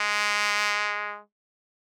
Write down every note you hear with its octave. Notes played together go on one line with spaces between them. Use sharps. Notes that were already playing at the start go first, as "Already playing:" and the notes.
Already playing: G#3